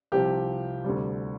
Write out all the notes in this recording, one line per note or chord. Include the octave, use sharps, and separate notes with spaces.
C2 C3 F3 G4
D2 C3 G3